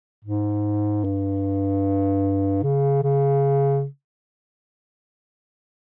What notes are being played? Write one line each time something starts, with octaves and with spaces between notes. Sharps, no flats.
G#2
G2
C#3
C#3